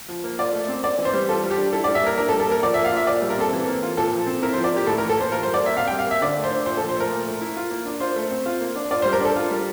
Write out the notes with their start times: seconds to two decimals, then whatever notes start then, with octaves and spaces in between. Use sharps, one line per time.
0.08 F3
0.24 A#3
0.39 F4 D5
0.53 A3
0.68 C4
0.84 C4 D5
0.98 E3
1.05 C5
1.14 G3
1.29 F4 A4
1.44 G3
1.50 G4
1.58 D4
1.73 E4 A4
1.84 D5
1.88 G3
1.95 E5
2.03 A#3 A#4
2.18 D4 A#4
2.29 A4
2.33 G3
2.40 A4
2.47 A#3 A#4
2.63 F3 D5
2.74 E5
2.77 A#3
2.85 F5
2.92 F4 E5
3.07 A#2 D5
3.22 G3
3.30 A#4
3.38 C4 A4
3.53 E3
3.68 A#3
3.83 F4
3.97 A#2 A4
4.13 F3
4.27 C4
4.42 E4 A#4
4.53 C5
4.58 F3
4.64 D5
4.72 A#3 G4
4.86 A2 A4
4.98 A#4
5.02 E3
5.09 A4
5.16 A#3 C5
5.32 F4 A#4
5.43 C5
5.47 G3
5.54 D5
5.62 A#3 E5
5.77 C3 F5
5.88 G5
5.91 G3
5.99 F5
6.06 A#3 E5
6.21 D3 D5
6.37 A3
6.44 C5
6.51 D4
6.66 A#2 C5
6.77 A4
6.81 F3
6.89 C5
6.96 A3 A#4
7.11 A#2
7.26 A3
7.41 E4
7.57 F4
7.71 A#3
7.85 D4
8.00 F4 C5
8.16 A3
8.31 C4
8.46 F4
8.61 A#3
8.76 D4
8.91 F4 D5
9.02 C5
9.05 G3
9.13 A#4
9.20 D4 A4
9.36 F4
9.51 G3